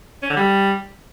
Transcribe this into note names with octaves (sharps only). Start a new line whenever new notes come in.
C#4
D3
G3